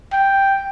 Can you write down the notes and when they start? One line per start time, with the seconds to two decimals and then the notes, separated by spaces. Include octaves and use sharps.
0.13 G5